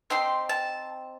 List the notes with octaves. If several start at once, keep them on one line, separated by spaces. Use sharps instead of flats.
C4 D#4 G4 C6
A5